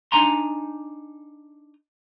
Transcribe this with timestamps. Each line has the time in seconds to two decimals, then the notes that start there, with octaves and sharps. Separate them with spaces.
0.12 D4 D#4 G#5 A#5 C6